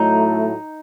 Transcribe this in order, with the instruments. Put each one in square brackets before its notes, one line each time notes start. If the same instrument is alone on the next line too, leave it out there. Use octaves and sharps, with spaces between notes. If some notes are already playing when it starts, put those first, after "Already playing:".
Already playing: [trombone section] A2 F#3 A3 E4 [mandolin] D#4